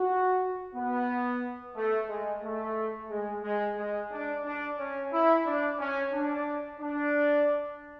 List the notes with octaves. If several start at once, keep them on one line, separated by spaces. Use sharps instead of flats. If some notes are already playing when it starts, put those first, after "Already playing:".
Already playing: F#4
B3
A3
G#3
A3
G#3
G#3
G#3
D4
D4
C#4
E4
D4
C#4
D4
D4